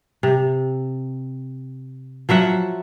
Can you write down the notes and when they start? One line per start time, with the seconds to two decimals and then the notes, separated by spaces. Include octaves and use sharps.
0.23 C3
2.29 F3 F#3 E5 F#5